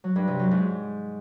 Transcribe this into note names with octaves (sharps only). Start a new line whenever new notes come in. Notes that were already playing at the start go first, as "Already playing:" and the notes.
F#3
G2
C3
F#3
G#2